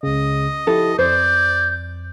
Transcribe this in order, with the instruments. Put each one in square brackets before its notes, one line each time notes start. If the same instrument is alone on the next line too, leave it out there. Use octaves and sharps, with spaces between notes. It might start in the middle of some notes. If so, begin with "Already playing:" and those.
[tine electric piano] C#2 C#3 [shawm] D#5
[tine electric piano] F3 E4 G4 [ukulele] A4
[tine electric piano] F2 [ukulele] C5 [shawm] D5 [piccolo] G6